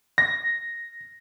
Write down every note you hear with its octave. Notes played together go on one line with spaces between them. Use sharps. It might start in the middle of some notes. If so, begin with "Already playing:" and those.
A#6